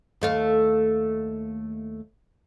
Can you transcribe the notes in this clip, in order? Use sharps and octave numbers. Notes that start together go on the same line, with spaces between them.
D#2 A3 F5